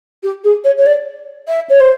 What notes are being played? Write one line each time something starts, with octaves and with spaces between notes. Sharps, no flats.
G4
G#4
C#5
C#5
D5
E5
C#5
C5